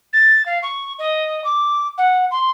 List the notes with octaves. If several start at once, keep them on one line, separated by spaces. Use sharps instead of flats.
A6
F5
C#6
D#5
D6
F#5
C6